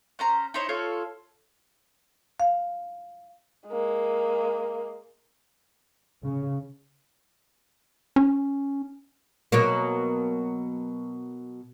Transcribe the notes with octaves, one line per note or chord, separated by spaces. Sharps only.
C#4 C5 A#5
D#4 E4 C5 C#5
F4 A4 C#5
F5
G#3 A#3
C#3
C#4
B2 F#3 A#3